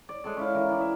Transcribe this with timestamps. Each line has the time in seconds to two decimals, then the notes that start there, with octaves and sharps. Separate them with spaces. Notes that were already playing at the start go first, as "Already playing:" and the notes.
0.09 D5
0.24 G#3 A4 D5
0.37 C#4 E4 F5
0.55 E3 A#4
0.69 E3 D5
0.81 E5